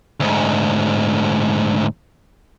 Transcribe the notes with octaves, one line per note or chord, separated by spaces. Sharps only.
D2 G#2